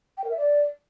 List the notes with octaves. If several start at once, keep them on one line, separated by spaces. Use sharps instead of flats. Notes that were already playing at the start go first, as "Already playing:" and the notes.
G5
A#4
E5
D5